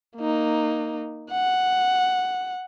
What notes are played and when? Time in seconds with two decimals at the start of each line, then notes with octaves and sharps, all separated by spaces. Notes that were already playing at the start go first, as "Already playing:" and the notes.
0.18 A#3 D#4
1.31 F#5